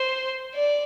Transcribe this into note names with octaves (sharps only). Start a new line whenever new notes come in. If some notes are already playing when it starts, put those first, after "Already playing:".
Already playing: C5
D5